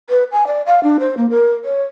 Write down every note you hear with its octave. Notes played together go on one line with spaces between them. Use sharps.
B4
G#5
D5
F5
D4
C5
A#3
A#4
C#5